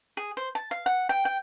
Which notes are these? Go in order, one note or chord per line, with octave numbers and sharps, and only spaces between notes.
G#4
C5
A5
F5
F#5
G5
G5